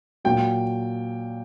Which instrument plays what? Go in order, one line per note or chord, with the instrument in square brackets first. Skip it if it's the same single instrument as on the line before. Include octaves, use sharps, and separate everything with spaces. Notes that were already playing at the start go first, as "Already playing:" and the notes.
[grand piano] A#2 F#3 G5